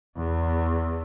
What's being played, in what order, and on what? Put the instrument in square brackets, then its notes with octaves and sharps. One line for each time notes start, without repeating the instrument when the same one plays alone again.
[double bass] E2